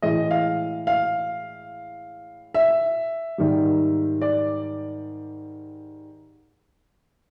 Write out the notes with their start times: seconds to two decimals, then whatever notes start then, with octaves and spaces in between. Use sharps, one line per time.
0.02 A2 E3 G#3 D#5
0.31 F5
0.87 F5
2.54 E5
3.38 G#2 D#3 G3
4.22 D5